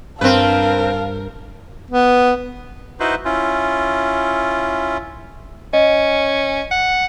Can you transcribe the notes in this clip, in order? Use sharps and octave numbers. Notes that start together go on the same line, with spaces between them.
G2 C4 D4 A#4 B4 F5 A5
B3
D#4 E4 F#4 B4 C5
C#4 E4 F4
C#4 D#5
F#5